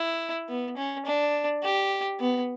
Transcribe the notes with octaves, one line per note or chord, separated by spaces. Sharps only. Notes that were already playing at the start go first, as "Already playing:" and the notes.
Already playing: E4
B3
C#4
D4
G4
B3